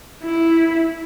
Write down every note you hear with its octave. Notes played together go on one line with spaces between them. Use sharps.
E4